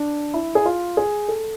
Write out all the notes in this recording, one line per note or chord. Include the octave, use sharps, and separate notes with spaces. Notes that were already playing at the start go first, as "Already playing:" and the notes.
Already playing: D4
E4
G#4
F4
G#4
A4